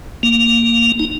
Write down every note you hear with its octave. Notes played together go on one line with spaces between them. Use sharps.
A#3
D#4